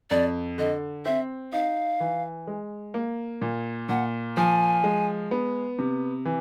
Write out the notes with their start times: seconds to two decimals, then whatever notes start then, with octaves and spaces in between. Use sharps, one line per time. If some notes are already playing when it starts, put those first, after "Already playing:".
0.10 F2 D5
0.58 D3 D#5
1.05 C4 E5
1.52 D#4 F5
2.00 E3
2.47 G#3
2.94 A#3
3.41 A#2
3.89 A#2 F#5
4.37 F3 G#5
4.84 G#3
5.31 B3
5.79 C3
6.25 E3